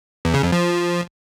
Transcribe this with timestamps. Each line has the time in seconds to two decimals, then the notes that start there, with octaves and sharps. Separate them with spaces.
0.25 E2
0.34 C#3
0.43 F2
0.52 F3